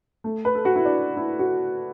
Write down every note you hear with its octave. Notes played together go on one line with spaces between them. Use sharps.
A3
B4
A4
F#4
E4
D4
E4
F#4